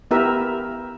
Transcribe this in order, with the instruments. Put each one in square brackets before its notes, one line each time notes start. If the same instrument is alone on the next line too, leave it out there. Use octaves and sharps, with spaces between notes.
[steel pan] B3 E4 G4 A#4 E5